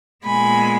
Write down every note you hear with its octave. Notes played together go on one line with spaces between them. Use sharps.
A#2 G#3 B3 G#5 B5